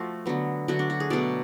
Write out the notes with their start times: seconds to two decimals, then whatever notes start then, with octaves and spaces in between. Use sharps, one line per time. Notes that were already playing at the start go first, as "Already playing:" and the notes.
Already playing: F3 A3 F#4
0.26 D3 F#3 B3
0.68 D3 F#3 A3 F#4
0.79 D4
0.90 F#4
1.00 G#4
1.10 B2 F#3 A3 D5